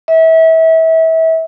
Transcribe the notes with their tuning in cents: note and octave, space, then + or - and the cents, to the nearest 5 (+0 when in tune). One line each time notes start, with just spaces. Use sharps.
E5 -30